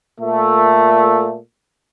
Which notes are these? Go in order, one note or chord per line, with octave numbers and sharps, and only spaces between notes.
A#2 A3